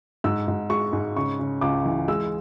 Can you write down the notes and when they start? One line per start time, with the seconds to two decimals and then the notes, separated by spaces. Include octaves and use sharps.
0.24 G#2 E6
0.48 G#2
0.70 G#3 C#6
0.93 G#2
1.16 C#3 C#6
1.39 C#3
1.61 C#2 D6
1.85 E3
2.08 G#3 E6